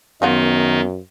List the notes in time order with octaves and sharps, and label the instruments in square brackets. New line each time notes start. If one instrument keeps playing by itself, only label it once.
[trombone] F#2 [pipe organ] D#3 D#4 [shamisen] F3 F4 F#4 [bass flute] B3